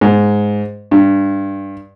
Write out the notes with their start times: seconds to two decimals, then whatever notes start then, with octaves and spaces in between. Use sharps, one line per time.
0.01 G#2
0.91 G2